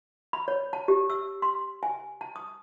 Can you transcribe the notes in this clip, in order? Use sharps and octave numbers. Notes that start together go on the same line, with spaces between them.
B5
C#5
A5
G4
E6
C6
G#5
A5
D#6